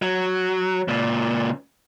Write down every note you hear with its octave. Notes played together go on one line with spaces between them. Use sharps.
F#3
C#2 A#2